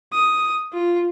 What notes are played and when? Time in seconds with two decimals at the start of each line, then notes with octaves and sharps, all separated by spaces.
0.12 D#6
0.73 F4